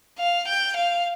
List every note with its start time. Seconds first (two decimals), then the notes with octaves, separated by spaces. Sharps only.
0.19 F5
0.48 G5
0.77 F5